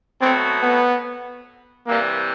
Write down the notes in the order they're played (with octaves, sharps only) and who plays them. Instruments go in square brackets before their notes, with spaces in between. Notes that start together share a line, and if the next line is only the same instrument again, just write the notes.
[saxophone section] B2 F#3 A3 [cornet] C4
[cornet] B3
[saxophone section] C3 E3 G3 [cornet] A#3